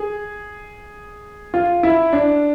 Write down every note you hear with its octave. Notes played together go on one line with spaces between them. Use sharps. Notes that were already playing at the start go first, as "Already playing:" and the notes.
Already playing: G#4
F4
E4
D4